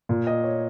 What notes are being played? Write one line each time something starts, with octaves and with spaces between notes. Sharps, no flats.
A#2
D#5
C#5